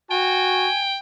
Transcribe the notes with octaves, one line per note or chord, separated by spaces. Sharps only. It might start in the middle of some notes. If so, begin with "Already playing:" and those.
F#4 G5 G#5